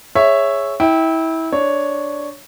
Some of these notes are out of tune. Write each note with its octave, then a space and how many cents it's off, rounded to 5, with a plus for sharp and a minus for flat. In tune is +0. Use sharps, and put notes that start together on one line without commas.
G#4 +0 C#5 -5 E5 +0
E4 -25 G5 +0
D4 +0 C#5 +0